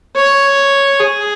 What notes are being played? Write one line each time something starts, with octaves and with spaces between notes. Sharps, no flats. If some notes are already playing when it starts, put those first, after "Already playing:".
C#5
G#4